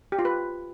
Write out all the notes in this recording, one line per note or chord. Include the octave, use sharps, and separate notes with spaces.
G4
F4
B4